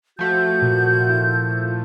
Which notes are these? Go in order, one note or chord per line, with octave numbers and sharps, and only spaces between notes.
F3 A3 F#4 G6
A#2
E4